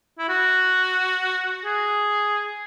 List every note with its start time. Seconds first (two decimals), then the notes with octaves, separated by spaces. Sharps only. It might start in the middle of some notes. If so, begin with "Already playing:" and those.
0.18 E4
0.29 F#4
1.65 G#4